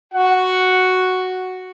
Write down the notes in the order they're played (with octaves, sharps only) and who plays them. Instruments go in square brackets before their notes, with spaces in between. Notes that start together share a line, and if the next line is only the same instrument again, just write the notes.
[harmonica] F#4 F#5